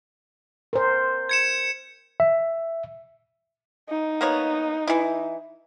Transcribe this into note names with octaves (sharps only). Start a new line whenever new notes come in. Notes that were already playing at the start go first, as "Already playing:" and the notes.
A#4 C5
G#6 C#7 E7
E5
D#4
A#3 B3 C#5
E3 E4